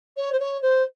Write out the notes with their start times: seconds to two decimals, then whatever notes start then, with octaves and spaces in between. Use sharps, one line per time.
0.17 C#5
0.32 C5
0.39 C#5
0.62 C5